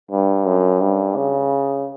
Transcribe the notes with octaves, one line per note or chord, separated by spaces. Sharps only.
G2
F#2
G2
C#3